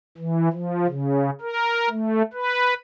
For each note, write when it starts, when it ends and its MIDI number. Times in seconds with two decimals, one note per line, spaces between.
0.18 0.49 52
0.52 0.87 53
0.87 1.30 49
1.41 1.89 70
1.90 2.22 57
2.33 2.74 71